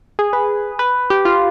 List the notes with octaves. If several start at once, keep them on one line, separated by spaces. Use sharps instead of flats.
G#4
B4
B4
G4
F4